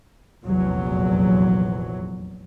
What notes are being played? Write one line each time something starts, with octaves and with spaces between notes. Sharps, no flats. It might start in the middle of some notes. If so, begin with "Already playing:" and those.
F1 A#1 E2 F#3